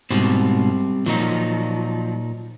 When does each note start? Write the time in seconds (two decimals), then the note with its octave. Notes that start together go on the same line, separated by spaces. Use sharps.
0.11 G#2 B2 G3 C4
1.06 A#2 F3 F#3 D#4